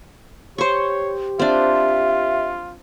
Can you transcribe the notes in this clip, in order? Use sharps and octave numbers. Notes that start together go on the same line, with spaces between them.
G4 C5 C#5 C#6
C4 D4 F4 E5